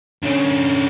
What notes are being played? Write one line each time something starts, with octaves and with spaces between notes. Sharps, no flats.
D3 C#4